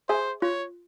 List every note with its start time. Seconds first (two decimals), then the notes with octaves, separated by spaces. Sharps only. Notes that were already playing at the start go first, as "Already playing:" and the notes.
0.09 G#4 C5 E5 G#5
0.42 F4 C#5